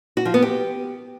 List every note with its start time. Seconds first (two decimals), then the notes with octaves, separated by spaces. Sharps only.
0.17 F#4
0.25 F3
0.34 B3
0.42 G4